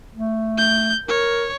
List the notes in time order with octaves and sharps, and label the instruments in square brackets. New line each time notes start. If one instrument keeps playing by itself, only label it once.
[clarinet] A3
[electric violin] G6
[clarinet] A#4 [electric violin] C#5